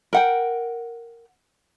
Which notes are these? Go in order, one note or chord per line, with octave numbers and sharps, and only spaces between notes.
A#4 F#5 G5